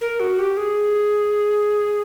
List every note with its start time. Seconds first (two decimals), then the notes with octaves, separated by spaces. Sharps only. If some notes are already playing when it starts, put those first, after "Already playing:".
0.01 A#4
0.20 F#4
0.39 G4
0.57 G#4